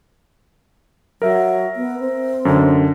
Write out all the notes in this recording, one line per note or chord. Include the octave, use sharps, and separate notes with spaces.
F#3 A#4 E5
B3
C4
F#2 D3